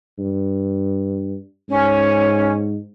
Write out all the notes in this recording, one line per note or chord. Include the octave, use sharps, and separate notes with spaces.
G2
G#2 C#4